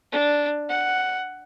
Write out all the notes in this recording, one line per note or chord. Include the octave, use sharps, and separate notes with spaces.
D4
F#5